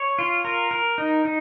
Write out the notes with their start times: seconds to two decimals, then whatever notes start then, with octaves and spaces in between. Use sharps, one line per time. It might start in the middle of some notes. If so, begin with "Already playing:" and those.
Already playing: C#5
0.19 F4
0.45 A#4
0.71 A#4
0.98 D#4
1.25 D#4